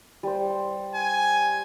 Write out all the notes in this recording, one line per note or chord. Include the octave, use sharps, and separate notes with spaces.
G3 C5
G#5